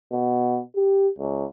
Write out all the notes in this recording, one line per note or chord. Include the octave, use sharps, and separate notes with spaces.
B2
G4
C#2